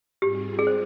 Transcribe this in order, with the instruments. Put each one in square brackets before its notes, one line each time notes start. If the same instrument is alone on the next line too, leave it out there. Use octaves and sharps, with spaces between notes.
[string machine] G#2 G3 C4 F4 G#4 [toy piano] G4
[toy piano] G#4
C5